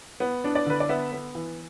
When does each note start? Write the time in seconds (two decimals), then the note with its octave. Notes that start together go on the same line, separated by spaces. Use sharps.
0.20 B3
0.44 D4
0.55 D5
0.66 D3 B4
0.80 D5
0.89 B3 E5
1.12 B3
1.35 E3